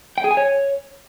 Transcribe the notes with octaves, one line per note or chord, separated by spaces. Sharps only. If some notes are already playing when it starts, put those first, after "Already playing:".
G5
G#4
G#5
C#5